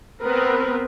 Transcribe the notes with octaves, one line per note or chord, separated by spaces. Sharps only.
B3 C4 A#4 B4